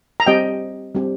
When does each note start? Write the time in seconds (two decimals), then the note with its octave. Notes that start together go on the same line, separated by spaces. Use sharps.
0.20 A#5
0.27 G3 C4 G4 D#5 G5
0.95 G3 C4 G4